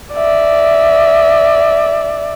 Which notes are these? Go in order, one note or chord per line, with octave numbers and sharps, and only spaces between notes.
D5 E5